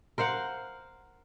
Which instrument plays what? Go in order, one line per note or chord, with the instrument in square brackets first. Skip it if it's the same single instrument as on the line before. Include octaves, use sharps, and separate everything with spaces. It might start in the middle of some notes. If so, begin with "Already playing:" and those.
[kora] A#4 C5 F5 F#5